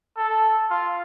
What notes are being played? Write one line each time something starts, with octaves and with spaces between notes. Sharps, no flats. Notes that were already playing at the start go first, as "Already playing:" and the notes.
A4
F4